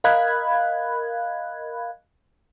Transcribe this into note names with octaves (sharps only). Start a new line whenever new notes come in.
A#4 D#5 F5 B5 F#6 G#6